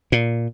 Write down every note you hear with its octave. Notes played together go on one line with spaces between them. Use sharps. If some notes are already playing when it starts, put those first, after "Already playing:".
A#2